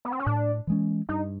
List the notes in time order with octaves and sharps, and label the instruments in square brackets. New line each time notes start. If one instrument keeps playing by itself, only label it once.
[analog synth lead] B3
C4
C#4
[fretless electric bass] A2 [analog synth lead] D4
[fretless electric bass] E3 G#3 C#4
[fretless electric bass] G2 [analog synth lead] D#4